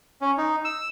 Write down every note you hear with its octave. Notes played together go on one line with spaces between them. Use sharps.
C#4
D#4
E6